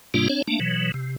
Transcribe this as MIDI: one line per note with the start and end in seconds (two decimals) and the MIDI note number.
0.14 0.28 44
0.14 0.28 48
0.14 0.28 55
0.14 0.28 58
0.14 0.28 62
0.14 0.28 65
0.30 0.42 60
0.30 0.42 62
0.30 0.42 73
0.48 0.59 57
0.48 0.59 58
0.48 0.59 62
0.60 0.92 47
0.60 0.92 52
0.60 0.92 54
0.94 1.16 48